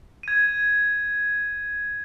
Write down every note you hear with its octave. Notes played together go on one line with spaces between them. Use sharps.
G#6 D#7